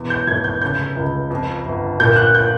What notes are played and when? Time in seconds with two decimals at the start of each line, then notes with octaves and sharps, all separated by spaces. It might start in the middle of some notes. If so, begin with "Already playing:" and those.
Already playing: E1 E2
0.10 G6
0.27 F1 G#6
0.44 G6
0.61 C#3 G6
0.96 C#2
1.30 F2
1.66 G1
2.00 A#2 G6
2.16 F#6
2.35 G6